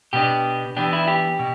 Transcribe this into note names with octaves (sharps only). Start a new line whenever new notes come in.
B2 B3 D4 G4
E3 B3 D4 G4
E4
G4
B2